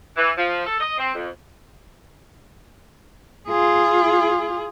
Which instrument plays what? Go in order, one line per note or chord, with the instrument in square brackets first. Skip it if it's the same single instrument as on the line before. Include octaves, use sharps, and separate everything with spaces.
[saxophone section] E3
F3
A4
D#5
C4
F2
[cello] F4 G#4